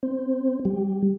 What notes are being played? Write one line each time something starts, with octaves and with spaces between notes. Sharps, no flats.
C4
G3